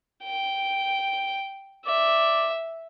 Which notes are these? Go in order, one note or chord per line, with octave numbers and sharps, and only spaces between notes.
G5
D5 E5